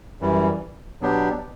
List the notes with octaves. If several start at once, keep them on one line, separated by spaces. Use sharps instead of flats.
F#2 E3 G3
B2 F#3 B3 D4 G4